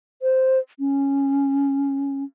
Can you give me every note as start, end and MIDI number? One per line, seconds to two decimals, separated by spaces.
0.22 0.59 72
0.80 2.24 61